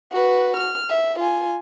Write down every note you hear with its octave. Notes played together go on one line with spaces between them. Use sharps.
F#4 B4
F6
E5
F4 G#5